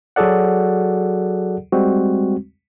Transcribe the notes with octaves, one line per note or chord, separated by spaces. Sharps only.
F#3 F#4 G#4 A4 D5 F#5
G3 G#3 C4 F#4